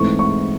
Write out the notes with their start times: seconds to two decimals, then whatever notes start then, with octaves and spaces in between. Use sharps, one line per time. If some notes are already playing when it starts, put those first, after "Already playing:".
Already playing: G#2 E3 A3 C4 C#6
0.19 C#6